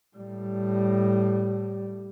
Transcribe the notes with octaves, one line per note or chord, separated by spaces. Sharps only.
A2 G3